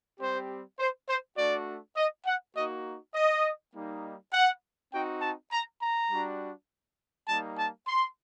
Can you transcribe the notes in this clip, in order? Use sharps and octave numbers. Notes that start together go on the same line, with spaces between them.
G3 C4 G4 C5
C5
C5
A3 D4 F#4 D5
D#5
F#5
A#3 D#4 F#4 D#5
D#5
G3 A#3 D#4
F#5
C4 D#4 F#4 G5
A5
A#5
A#5
G3 D4 F#4
G3 A#3 D#4 A5
A5
C6